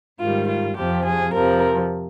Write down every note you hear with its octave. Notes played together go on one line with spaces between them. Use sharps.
G#2 D#3 G3 F4
F4
F2 C3 F3 G4
G#4
F2 C3 F3 A#4